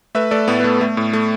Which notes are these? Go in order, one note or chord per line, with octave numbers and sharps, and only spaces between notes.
A3 B4 E5
A3 A4 D5
A2 B3
B3
A3
A3
A2
A3